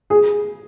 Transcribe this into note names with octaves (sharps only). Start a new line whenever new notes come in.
G#4